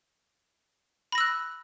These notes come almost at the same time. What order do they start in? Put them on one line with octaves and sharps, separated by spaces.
B5 A#6 E6 F#6